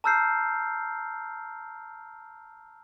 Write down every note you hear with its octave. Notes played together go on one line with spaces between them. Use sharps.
A5 A#5 E6 F6 G6 C7